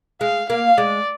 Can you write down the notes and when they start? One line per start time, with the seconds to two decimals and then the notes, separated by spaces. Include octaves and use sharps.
0.21 G#3 F5
0.49 A#3 F5
0.77 G#3 D5